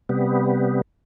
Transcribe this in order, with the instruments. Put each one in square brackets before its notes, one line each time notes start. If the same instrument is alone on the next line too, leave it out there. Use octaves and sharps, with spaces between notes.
[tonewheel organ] C3 G3 B3